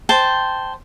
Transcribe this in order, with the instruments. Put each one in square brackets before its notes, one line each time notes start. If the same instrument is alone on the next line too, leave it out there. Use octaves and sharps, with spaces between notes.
[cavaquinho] C5 G5 A5